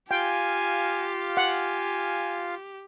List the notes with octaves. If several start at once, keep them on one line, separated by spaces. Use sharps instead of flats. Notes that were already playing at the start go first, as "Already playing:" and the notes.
F4 G4 F5 G5 G#5
F#5 G#5